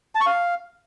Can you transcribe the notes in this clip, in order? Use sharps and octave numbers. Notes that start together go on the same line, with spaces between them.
A5
C#6
F5